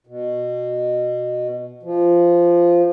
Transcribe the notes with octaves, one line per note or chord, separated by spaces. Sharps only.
B2
F3